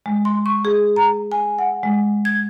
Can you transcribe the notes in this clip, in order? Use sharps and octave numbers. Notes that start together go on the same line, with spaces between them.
G#3
C6
C#6
G#4
A#5
G#5
F#5
G#3
G#6